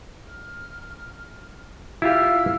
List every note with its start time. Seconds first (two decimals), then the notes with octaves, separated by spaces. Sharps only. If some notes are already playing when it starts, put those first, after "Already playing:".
0.24 F6
2.02 E4 F4 G4 F5 E6 F6